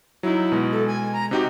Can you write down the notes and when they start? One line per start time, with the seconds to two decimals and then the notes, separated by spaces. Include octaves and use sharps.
0.23 F#3 D#4 E4
0.52 B2 G#3
0.72 A4
0.88 G#5
1.13 A#5
1.31 C3 D#4 F#4 G4